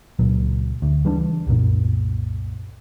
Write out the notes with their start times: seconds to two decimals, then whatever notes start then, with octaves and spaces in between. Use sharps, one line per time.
0.19 C#2 A#2 F#3
0.82 D2
1.05 C#3 E3 G3 D4
1.47 C2 F#2 A#2